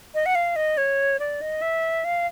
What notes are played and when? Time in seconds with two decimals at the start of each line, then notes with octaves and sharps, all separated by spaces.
0.15 D#5
0.26 F#5
0.35 F5
0.56 D#5
0.77 C#5
1.20 D5
1.41 D#5
1.62 E5
2.05 F5